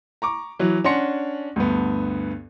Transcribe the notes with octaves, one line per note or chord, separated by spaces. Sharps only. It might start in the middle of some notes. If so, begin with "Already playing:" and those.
A#5 C#6 D6
E3 F#3
C#4 D4 F#5 C6 A#6 C#7
D2 G2 B3